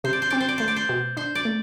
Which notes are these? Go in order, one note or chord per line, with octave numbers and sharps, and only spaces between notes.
C3 C5
D5
C5
C4 D5
C5
D5
A3 C5
D5
C5
B2
D4 C5
D5
A3